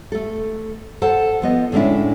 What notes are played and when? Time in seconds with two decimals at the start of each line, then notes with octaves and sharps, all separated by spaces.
0.12 A3 A4
1.02 A4 C5 F#5 A5
1.42 F3 B3 D#5
1.72 A2 D3 G#3 C#4 D4 E4